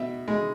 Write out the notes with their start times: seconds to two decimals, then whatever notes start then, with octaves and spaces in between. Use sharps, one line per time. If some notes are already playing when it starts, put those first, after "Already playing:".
Already playing: B2 E5
0.28 G#3